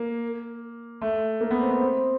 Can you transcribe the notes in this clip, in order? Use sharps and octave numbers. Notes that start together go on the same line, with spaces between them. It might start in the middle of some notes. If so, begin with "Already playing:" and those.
Already playing: A#3
A3
A#3
B3
C4
B3
C4